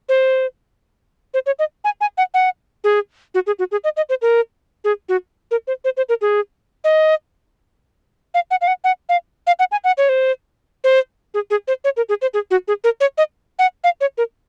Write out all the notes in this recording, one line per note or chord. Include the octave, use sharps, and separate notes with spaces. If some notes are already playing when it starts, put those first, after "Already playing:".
C5
C5
C#5
D#5
G#5
G#5
F#5
F#5
G#4
F#4
G#4
F#4
G#4
D#5
D#5
C5
A#4
G#4
F#4
A#4
C5
C5
C5
A#4
G#4
D#5
F5
F#5
F5
F#5
F#5
F5
F5
F#5
G#5
F#5
C#5
C5
C5
G#4
G#4
C5
C#5
A#4
G#4
C5
G#4
F#4
G#4
A#4
C#5
D#5
F#5
F5
C#5
A#4